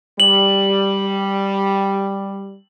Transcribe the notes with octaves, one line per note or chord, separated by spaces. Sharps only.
G3 F#7